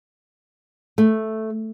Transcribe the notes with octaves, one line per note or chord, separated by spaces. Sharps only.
A3